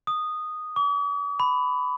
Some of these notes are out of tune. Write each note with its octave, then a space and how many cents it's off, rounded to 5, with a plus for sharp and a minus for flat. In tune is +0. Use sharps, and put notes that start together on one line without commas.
D#6 -10
D6 -45
B5 +20